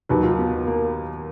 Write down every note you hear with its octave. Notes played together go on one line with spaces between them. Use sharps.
D#2 D#3 F#3 B4
F4
B3
A#3